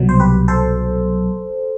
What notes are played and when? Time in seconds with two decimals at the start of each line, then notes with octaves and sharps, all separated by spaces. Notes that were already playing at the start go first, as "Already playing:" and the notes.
Already playing: C2 B2 F#3
0.09 C5
0.20 G4 B4
0.48 A4 C5